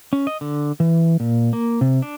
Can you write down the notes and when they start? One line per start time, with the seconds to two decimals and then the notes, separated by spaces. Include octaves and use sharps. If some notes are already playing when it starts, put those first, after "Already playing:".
0.13 C#4
0.27 D#5
0.41 D3
0.80 E3
1.20 A#2
1.53 A#3
1.81 C3
2.02 D4